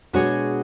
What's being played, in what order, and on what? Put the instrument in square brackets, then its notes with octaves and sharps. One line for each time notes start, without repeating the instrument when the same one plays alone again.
[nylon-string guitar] B2 G#3 D4 G#4 C#5 [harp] F#4